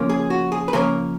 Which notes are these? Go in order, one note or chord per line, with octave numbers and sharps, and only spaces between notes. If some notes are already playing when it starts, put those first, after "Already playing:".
Already playing: C#3 F3 A#3 C#4
G#4
F#4
G#4
B4
C#3 F3 A#3 C#4 A#4